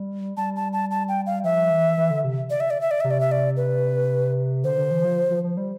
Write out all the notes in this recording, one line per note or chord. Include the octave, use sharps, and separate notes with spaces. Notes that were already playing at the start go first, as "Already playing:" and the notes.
Already playing: G3
G3 A5
A5
A5
A5
G5
F5
F3 E5
E3
E3
D3
C3
D5
E5
D5
E5
D5
C3 E5
D5
E5
D5
B4
D3 C5
D3
E3
F3
F3
F3
G3